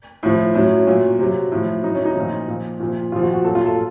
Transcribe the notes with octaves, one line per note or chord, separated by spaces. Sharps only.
A2 F3
A2 F#3 C#4
A#2 F#3
C3 F#3
A2 F3
A2 F#3 D#4
C#4
D#4
A#2 F3
A#2 F3
A#2 F3
A#2 F3 F4
F#4
F#4
A#2 F#3 A4
F4
A4